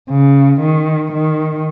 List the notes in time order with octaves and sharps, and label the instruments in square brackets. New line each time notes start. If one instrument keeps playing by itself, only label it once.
[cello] C#3
D#3
D#3